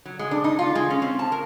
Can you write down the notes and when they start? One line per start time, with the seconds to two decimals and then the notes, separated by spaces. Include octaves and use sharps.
0.05 F#3
0.19 G#3
0.31 D4
0.44 D#4
0.59 F4
0.75 G#3
0.90 C#4
1.02 C4
1.19 A5
1.32 A#4